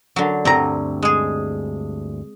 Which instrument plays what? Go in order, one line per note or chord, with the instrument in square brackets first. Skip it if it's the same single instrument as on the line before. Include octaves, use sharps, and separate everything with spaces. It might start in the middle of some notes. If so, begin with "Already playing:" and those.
[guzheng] D3 F#3
[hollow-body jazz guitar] D2 G2 A#5 [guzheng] C4
[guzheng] G#3 G#4